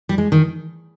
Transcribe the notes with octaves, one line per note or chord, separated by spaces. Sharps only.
G3
G#3
D#3